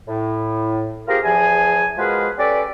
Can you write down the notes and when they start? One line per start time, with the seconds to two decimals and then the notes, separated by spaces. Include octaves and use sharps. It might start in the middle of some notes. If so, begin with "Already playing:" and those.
0.08 A2
1.08 C4 F4 G4 G#4 A#4
1.23 E2 E3 F3 G#4 G#5
1.97 B2 F3 G#3 G#4 A#4 B4
2.38 C#4 G4 A4 B4 D5